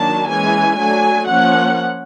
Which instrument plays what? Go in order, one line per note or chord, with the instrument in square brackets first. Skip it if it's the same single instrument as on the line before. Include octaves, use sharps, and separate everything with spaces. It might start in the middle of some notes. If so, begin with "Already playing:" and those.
Already playing: [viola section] D#3 F#3 A#3 D4 A5
E3 G#3 C#4 G#5
F#3 A3 D4 G#5
F3 A#3 C#4 F#5